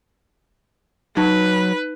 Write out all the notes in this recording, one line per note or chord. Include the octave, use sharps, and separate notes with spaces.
F#3 D#4 B4